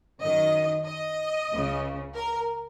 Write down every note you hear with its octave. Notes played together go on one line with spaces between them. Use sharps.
F#2 D#3 D#5
D#5
C#2 C#3
A#4